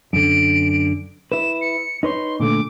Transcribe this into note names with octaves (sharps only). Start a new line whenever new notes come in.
F#2 D3 D7
E4 B4 E7
C#7
D#4 B4 C#5 C6
A#2 D3 A3 D6